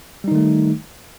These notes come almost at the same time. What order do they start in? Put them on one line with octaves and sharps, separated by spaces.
G3 D#4 D#3 A3